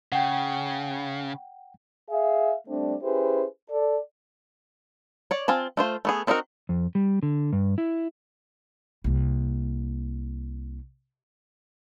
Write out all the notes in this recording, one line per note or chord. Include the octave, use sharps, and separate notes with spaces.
C#3 F#5 G5
G#4 E5 F5
G3 A3 C4 D4
C#4 E4 G4 G#4 B4 C5
A4 D5
C#5 D5
C4 F4 G#5 A5
A3 F4 C5
A3 B3 G#4
C4 D4 D#4 F#4 A#4
F2
G3
D3
G2
E4
C2 A#3